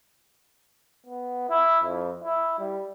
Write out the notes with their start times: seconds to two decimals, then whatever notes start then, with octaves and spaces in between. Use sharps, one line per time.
1.07 B3
1.49 E4
1.84 F2
2.24 E4
2.59 G3